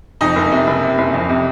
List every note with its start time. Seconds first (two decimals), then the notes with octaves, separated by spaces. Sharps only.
0.21 F2 D#4 D#5
0.36 F#1
0.52 C3
0.67 F#1
0.83 C3
0.98 F#1
1.14 F2
1.29 C3